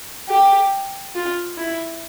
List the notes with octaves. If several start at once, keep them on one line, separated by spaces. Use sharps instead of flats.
G4
F4
E4